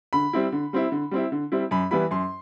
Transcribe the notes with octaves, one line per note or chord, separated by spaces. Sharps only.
D3 B5
G3 C4 E4
D3
G3 C4 E4
D3
G3 C4 E4
D3
G3 C4 E4
F#2 B5
E3 G3 B3 E4 B5
F#2 C6